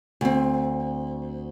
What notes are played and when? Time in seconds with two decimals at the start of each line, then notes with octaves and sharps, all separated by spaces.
0.21 D2 C4